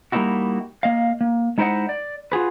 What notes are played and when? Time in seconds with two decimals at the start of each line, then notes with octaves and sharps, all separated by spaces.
0.12 G3 A#3 C4 D#4 E4 F#4
0.83 A#3 D#5 F5
1.21 A#3
1.58 G#3 D#4 E4 C5 D#5 F#5
1.89 D5
2.32 F4 F#4 G#4 B4